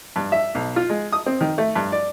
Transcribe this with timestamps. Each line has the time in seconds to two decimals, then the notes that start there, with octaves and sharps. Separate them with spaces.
0.16 G2
0.32 E5
0.55 B1
0.76 F4
0.90 G#3
1.12 D#6
1.26 C4
1.41 D#3
1.58 A3
1.76 G2
1.92 D5